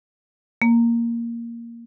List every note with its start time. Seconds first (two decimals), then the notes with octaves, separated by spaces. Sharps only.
0.62 A#3